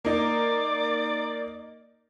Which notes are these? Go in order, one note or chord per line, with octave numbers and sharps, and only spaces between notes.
A#3 D#4 A#4 D5